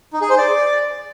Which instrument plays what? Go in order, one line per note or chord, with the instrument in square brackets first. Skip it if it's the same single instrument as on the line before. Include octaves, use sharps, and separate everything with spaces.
[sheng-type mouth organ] D#4
G#4
C5
D5